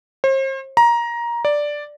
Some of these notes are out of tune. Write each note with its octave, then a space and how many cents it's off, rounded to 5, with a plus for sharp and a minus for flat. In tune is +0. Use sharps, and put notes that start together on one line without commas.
C5 +40
A#5 +15
D5 +0